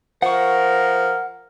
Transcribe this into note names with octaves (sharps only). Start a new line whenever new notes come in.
F3 A#4 F#5 C#6